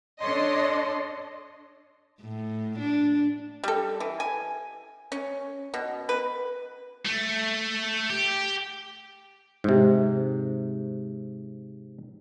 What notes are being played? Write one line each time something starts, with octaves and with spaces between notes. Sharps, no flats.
D4 A4 C#5 D#5 C6
A2
D4
G3 A4
E3
G#5
C#4
B2
B4
A3
G4
G#2 C3